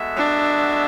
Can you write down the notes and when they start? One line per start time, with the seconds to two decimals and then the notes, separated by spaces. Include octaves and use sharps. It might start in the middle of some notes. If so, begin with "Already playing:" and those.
Already playing: G#3 B3 F#4 A4 E5
0.17 D4